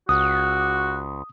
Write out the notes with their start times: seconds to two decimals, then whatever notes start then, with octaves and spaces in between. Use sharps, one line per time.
0.09 C#2 F#4 D#6